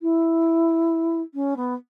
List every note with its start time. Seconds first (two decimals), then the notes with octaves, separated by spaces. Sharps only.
0.02 E4
1.34 C#4
1.56 B3